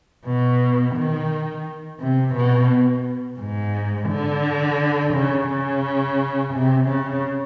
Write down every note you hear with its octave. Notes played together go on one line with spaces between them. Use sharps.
B2
D#3
C3
B2
G#2
D3
C#3
C#3
C3
C#3